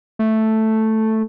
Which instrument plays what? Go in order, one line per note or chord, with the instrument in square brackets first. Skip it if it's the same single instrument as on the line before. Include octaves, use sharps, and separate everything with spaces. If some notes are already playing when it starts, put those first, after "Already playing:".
[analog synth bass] A3